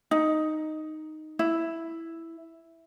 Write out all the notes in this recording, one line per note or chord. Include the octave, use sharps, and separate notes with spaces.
D#4
E4